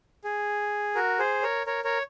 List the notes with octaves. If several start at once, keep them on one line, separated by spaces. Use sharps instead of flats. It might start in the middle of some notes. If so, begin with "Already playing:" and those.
G#4
F#4 A#4
G#4 C5
A#4 C#5
A#4 C#5
A#4 C#5